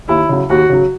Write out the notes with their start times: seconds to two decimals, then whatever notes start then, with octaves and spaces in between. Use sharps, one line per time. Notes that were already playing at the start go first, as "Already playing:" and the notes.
0.08 D#2 E4
0.29 C#3 F#3
0.50 D#2 F#4
0.69 C#3 F#3